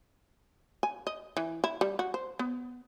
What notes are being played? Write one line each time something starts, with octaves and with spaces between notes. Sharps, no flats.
G#5
D#5
E3
E4
G3
F#4
C5
B3